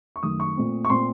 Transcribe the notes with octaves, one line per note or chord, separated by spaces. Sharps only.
C#6
F#2 D#3 A3 D#6
C#6
A#2 A3 C4
C#6
A#2 A3 C4 C6